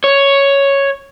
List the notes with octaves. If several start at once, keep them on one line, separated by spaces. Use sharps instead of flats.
C#5